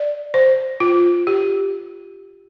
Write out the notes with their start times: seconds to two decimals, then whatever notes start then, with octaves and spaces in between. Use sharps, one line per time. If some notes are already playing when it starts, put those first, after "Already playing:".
Already playing: D5
0.34 C5
0.80 F4
1.27 G4